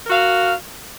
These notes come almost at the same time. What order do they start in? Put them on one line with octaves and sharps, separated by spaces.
A#4 F#4 F5